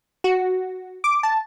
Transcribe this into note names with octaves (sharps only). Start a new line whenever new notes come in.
F#4
D6
A5